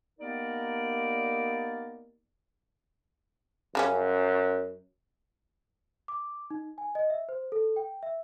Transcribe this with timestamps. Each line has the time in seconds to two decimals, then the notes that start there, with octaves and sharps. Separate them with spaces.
0.19 A#3 B3 D#4 G4 A#4 D5
3.75 F#2 C#3 G3 C#4
6.08 D6
6.50 D#4
6.78 G#5
6.95 D#5
7.10 E5
7.29 C5
7.52 A4
7.76 G5
8.03 E5